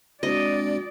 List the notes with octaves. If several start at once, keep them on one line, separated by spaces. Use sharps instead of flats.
G#3 C4 D4 F#4 D5 D#5